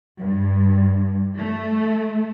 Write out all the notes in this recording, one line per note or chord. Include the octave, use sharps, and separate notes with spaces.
G2
A3